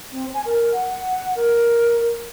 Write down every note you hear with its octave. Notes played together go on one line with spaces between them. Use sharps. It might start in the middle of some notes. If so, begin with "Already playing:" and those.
C4
G#5
A#4
F#5
A#4